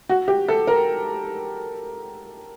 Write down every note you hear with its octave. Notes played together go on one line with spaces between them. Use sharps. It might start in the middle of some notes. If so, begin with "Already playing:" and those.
F#4
G4
A4
A#4